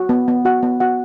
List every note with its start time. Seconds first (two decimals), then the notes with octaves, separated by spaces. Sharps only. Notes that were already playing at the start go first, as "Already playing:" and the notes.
Already playing: F#4
0.09 B3
0.28 B3
0.45 F#4 F#5
0.63 B3
0.80 F#4 F#5